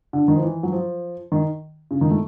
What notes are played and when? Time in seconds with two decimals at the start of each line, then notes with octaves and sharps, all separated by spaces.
0.13 D3
0.28 D#3
0.36 F3
0.42 E3
0.63 F#3
0.72 F3
1.32 D#3
1.91 C#3
2.01 D#3
2.11 A3